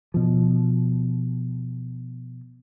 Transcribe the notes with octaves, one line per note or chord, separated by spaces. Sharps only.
B2 F3